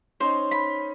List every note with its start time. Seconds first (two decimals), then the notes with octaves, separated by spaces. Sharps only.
0.20 C#4 D#4 C5
0.51 B5